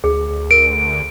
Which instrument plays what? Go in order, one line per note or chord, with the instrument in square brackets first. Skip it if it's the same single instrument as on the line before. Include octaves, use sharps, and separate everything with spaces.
[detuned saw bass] D2 [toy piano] G#4
[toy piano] A#4 [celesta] D7